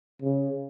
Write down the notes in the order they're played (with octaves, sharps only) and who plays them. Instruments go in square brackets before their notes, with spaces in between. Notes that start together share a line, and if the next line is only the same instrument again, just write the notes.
[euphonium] C#3